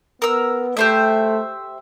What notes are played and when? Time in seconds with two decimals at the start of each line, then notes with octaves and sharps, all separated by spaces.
0.22 B3 A#4 E6
0.77 A3 G4 C5 E5